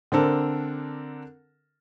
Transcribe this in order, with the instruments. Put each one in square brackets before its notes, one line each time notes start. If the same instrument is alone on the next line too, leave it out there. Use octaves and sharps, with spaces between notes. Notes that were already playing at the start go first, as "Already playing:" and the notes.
[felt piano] D3 C4 D4 A4 A#4